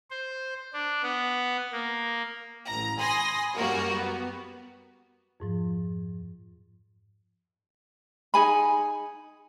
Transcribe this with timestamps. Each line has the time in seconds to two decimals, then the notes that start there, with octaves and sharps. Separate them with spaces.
0.10 C5
0.73 D4
1.02 B3
1.72 A#3
2.66 A1 A#5
2.99 G#5 B5 C6 D#6 A#6
3.56 F#2 G3 A#3 F#4 A#4
3.95 B3
5.40 F2 G#2 F3
8.34 D#4 G#4 G#5 B5